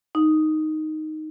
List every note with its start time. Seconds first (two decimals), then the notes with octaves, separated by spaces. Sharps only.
0.15 D#4